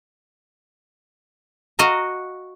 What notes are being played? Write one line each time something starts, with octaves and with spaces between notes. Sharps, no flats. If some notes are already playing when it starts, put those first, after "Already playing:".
F#4 D#5 F5 A#5